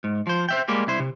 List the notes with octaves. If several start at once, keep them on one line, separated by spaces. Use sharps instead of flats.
G#2
F3 C5
C5 E5 G5
G3 G#3 A#3 G4
C2 E4 C5
C3